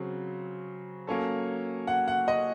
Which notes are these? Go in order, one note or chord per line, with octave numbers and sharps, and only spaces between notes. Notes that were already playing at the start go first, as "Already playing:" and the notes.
Already playing: C#3 F#3 C4
F#3 A#3 C#4 A4
F#5
F#5
D#5